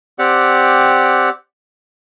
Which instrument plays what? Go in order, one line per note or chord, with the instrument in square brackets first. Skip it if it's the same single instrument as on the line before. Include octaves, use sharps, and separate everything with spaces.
[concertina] C4 G4 D5 F#5